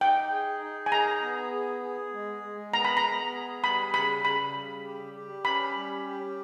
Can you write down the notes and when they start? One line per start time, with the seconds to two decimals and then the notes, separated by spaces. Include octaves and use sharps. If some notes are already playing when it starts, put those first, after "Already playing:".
0.01 D#4 G5
0.31 G#4
0.61 D#4
0.86 G#5
0.92 G#4 A#5
1.22 B3
1.52 G#4
1.82 G#4
2.13 G#3
2.43 G#3
2.72 B3 A#5
2.85 B5
2.97 A#5
3.04 B3
3.33 G#4
3.64 G3 B5
3.94 C#3 B5
4.24 C#3 B5
4.54 G3
4.84 G4
5.14 G4
5.45 C#4 B5
5.75 G3
6.05 G4